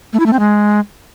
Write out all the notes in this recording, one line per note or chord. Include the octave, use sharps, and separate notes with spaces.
A3
E4
A3
C4
G#3